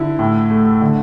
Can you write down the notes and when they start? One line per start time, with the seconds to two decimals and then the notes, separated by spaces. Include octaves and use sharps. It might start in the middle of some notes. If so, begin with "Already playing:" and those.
Already playing: D3 E4
0.19 A2
0.50 A3
0.82 D3